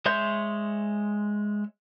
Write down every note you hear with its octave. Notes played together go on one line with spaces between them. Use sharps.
G#3 C#5 E5 C6 G6